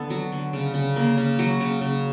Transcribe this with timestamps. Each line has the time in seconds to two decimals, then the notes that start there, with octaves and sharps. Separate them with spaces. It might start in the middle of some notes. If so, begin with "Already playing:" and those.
Already playing: D3 B3 A4
0.10 F#3
0.32 D3
0.53 C#3
0.74 C#3
0.96 A#3
1.17 C#3
1.39 F#3
1.60 C#3
1.81 C#3